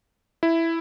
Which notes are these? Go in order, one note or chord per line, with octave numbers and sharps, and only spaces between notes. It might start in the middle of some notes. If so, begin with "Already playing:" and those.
E4